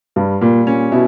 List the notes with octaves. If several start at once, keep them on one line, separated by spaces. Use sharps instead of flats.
G2 G3
A#2 G3
A#2 C#4
B2 E4